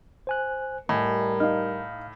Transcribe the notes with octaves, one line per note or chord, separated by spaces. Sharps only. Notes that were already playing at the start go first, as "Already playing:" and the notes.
C5 G#5 F#6
A2 G3 A#4 D#5 G#5
D#4 F5 F6